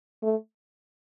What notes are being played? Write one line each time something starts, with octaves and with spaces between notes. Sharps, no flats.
A3